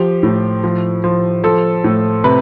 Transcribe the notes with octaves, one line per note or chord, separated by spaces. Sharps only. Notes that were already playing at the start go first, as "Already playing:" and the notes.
Already playing: F3 G4
A2
F3
F3
F3 A4
A2
C3 B4